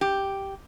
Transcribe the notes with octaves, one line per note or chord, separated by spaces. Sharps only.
G4